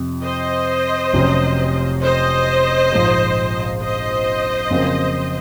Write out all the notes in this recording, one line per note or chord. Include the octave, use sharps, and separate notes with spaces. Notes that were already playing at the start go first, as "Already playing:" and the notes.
Already playing: F2 C3
C5 D#5
F1 F2 C3 F#3 C#4
C5 D#5
A#1 G#2 F3
C5 D#5
F2 C#3 F#3 A#3